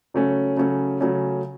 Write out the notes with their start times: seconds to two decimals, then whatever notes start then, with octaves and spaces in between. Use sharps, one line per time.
0.14 C#3 F#3 A3 C#4
0.57 C#3 F#3 A3 C#4
1.01 C#3 F#3 A3 C#4